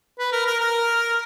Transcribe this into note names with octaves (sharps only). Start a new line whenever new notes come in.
B4
A#4
A#4
A#4